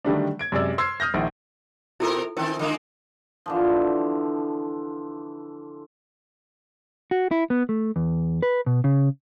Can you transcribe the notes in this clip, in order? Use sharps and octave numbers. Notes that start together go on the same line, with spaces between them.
D3 D#3 F#3 G3 A3 D4
G#6 D7
F#2 C3 G#3 D5 E6
C6 E6 F6 G#6 C7
D#6 F6 G6 A#6
A#1 D#3 E4 F#5
B2 C4 E4 F4 A4 A#4
D#3 C4 C#4 E4 A#4
D3 G#3 A#3
D3 E3 F3
F#4
E4
B3
A3
E2
B4
B2
C#3